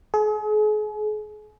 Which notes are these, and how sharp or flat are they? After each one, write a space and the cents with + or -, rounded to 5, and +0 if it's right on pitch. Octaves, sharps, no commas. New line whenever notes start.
G#4 +35